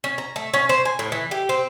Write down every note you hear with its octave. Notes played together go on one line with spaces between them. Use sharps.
C#4
A#5
A3
C#4
C5
G#5
A2
E3
G4
C4